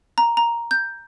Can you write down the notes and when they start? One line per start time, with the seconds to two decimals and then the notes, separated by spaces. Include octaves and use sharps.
0.18 A#5
0.37 A#5
0.71 G6